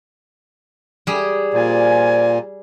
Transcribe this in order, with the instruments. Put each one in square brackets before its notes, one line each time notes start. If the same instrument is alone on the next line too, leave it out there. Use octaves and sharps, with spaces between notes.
[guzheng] G3 G#4
[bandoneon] A#2 [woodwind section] F3 D5 G#5